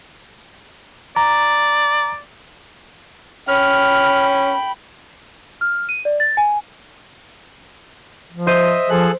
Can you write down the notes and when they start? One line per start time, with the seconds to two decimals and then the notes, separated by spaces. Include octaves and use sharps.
1.16 D5 A#5
3.48 C#4 G5 B5 F6
5.61 F6
5.89 D#7
6.05 D5
6.20 A6
6.37 G#5
8.32 F3
8.47 C5 D#5 E5 D#7
8.90 F3 G#4 A4 F#6